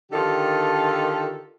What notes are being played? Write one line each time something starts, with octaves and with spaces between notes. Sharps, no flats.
D3 D#3 F4 G4 A4